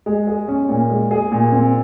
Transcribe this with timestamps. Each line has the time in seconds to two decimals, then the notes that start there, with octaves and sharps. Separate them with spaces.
0.06 G#3
0.27 G#4
0.48 C#4
0.69 A#2
0.89 G#3
1.11 G#4
1.32 A#2
1.52 C4